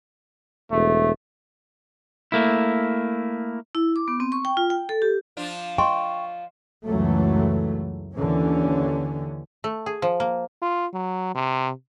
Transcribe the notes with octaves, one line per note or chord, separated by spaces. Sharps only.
E1 A3
A3 A#3 E4
E4
D6
B3
C4
C#6
G5
F4
G5
A4
G4
F3 D4 F4
C5 D#5 G5 C6 C#6
C#2 F#2 E3 F#3 A3
D#2 D3 E3 C#4
A3
G#4
F3
A#3
F4
F#3
C3